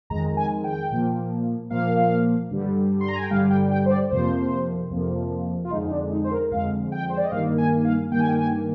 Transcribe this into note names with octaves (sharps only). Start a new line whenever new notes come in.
F2 D#3 G#3 A#5
G#5
G5
A#2 F3 A#3
A#2 F3 A#3 F5
G2 D3 G3
C6
A#5
G#5
G5
G2 D3 G3 F5
G5
G5
C5
D5
F2 C3 F3 A#3 C5
F2 C3 F3 A#3
F4
F2 D3 G#3 D#4
D#4
D4
D#4
C5
A#4
F2 D3 G#3 F5
G5
C5
D5
D#5
G2 D#3 A#3 F5
G#5
F5
G2 D#3 A#3 G5
G#5
G5
G#5